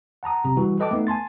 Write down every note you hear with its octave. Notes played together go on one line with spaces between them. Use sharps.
F#5 A5 A#5 D#6
B1 C3 A#5
E3 G3 F#4
A4 B4 D#5 G5 A5 D6
A3 B3 D#4
G#5 A5 C6 A6